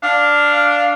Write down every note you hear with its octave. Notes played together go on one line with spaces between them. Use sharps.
D4 F5